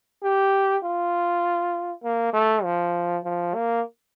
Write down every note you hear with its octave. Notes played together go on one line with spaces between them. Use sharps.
G4
F4
A#3
A3
F3
F3
A#3